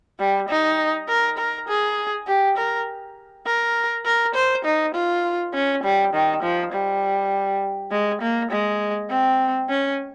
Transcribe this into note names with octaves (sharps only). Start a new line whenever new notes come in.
G3
D#4
A#4
A#4
G#4
G4
A#4
A#4
A#4
C5
D#4
F4
C#4
G3
D#3
F3
G3
G#3
A#3
G#3
C4
C#4